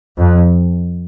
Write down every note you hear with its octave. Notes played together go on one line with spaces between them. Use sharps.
F2